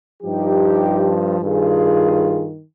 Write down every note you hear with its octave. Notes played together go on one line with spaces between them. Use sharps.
G2 F3 D#4 G4
G2 D#3 F4 G#4